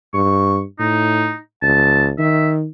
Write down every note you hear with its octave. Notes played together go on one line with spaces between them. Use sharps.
G2 C#6
A2 D#4
C#2 A5
D#3 E5